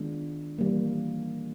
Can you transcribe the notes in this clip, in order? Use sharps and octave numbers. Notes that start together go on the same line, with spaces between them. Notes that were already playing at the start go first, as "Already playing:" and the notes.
Already playing: D#3 G#3 B3 D4 F4
E3 G3 A#3